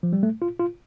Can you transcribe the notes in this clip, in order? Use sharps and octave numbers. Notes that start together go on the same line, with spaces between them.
F3
G3
A3
F4
F4